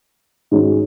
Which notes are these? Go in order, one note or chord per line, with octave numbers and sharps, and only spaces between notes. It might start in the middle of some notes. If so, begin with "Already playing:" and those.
G#2 D#3 G#3 C#4 F#4